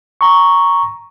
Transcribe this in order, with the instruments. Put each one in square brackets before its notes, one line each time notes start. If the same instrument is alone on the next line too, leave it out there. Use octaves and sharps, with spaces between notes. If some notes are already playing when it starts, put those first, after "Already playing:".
[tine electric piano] A#5 C#6